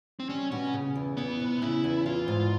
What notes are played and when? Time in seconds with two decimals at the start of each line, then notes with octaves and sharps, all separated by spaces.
0.20 C4
0.29 G3 C#4
0.51 B2 C#4
0.74 C#3
0.95 E2
1.17 E3 B3
1.40 C3
1.62 C#3 E4
1.84 E2
2.06 E3 F4
2.28 G#2